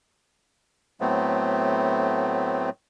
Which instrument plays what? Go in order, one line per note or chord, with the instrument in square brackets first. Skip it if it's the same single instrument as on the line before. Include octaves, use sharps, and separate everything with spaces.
[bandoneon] A2 F#3 A3 B3 C4